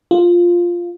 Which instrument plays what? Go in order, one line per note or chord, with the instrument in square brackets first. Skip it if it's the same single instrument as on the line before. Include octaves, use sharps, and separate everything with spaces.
[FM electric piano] F4